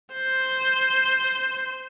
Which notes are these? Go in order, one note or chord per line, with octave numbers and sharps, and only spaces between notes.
C5